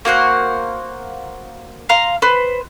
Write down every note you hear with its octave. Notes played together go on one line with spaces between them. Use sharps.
A#3 F#4 C5 F#5
F5 A#5 C6
B4 C5